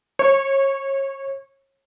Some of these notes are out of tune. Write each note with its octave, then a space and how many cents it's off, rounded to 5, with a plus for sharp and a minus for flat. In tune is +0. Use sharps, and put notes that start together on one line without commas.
C#5 -30 C#6 -5